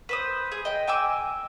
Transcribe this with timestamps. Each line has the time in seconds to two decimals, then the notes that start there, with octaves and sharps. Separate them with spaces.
0.09 B4 C5 D#6
0.52 G#4
0.65 D#5 G5
0.87 G5 G#5 D6 E6